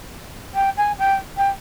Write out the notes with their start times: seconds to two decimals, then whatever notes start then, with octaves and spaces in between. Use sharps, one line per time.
0.54 G5
0.77 G#5
0.98 G5
1.37 G5